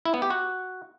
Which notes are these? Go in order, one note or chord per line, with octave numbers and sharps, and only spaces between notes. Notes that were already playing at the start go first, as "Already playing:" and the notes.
E4
B3
G4
F#4